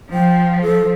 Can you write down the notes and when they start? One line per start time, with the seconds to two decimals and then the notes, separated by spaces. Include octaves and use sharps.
0.13 F3 G5
0.62 A4